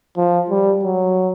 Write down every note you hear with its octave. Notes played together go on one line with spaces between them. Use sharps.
F3
G3
F#3